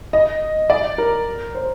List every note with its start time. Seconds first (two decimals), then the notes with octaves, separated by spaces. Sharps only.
0.13 D#5
0.70 D5
0.98 A#4
1.55 C5